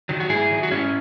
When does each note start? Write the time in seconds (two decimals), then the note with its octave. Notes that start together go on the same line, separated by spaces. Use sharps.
0.09 D#3 F#3
0.20 F#4
0.29 G#2 E4 G#4
0.51 D#3 F#3
0.63 F#4
0.71 G#2 C#4 E4